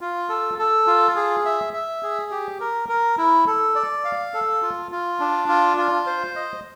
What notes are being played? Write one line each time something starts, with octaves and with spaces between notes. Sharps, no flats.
F4
A4
A4
F4
G#4
E5
E5
G#4
G4
A#4
A#4
E4
A4
D5
F5
A4
F4
F4
D4
F4
F4
C5
D#5